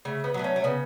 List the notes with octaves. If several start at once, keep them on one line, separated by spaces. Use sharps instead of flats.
C#3 A3
B3
F#3 A3 B3
C#4
A3
C#3 B3